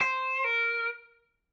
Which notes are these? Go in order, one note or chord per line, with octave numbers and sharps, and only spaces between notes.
C5
A#4